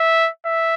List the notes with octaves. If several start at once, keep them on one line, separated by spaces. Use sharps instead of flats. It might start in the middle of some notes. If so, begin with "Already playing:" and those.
Already playing: E5
E5